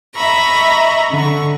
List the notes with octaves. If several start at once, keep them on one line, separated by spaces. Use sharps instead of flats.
D#5 E5 A#5 B5 C#6
D3 C#6